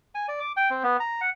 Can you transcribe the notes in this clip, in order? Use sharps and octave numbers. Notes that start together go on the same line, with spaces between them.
G#5
D5
D6
G5
C4
B3
A#5
F#5